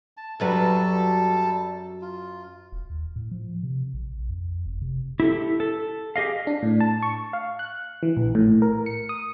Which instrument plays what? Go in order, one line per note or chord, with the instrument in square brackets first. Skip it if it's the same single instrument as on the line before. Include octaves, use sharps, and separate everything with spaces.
[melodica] A5
[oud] F#2 F#3 B4 [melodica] G3 A4 A5
[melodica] F4
[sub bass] E1
D#2
A2
F3
C3
A#1
F2
F#1
C3
[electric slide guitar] E4 G4 A4
A4
G4 G#4 D#5 F5
[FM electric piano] D4
A2
A5
C#6
F5
F#6
E3
A#1
A2
A#4
C#7
D#6